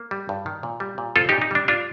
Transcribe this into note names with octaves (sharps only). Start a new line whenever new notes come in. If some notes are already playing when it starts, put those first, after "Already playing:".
Already playing: A#3
G3
G2
D#3
A#2
G3
A#2
C4 F4 A4
A#2 D#4 G4
D#4
G3 D4
D4 F4